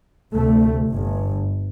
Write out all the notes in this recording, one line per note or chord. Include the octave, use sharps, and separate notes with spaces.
D2 C3 A3
G1 G2